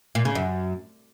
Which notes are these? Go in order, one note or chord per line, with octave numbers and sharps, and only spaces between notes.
A#2
C#3
F#2